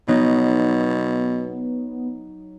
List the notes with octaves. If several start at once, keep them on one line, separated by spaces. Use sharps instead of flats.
B2 F#3 B3 D#4